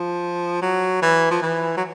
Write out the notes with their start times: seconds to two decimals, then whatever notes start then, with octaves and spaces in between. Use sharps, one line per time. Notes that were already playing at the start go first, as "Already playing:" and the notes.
Already playing: F3
0.62 F#3
1.02 E3
1.31 F3
1.42 E3
1.77 F#3